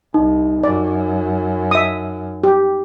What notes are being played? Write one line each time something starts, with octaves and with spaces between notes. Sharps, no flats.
C2 D#4
F#2 D5
E5 D#6
G4